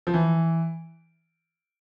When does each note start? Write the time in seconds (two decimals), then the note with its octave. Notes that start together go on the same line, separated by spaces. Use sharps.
0.07 F3
0.14 E3